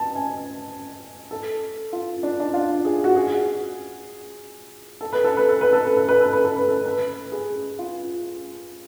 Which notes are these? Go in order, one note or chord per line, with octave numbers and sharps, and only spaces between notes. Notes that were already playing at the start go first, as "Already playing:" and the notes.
Already playing: A5
G#5
A4
F4
D4
D4
F4
G#4
F#4
G#4
A4
B4
A4
B4
A4
B4
A4
B4
A4
B4
A4
B4
A4
B4
A4
B4
G#4
F4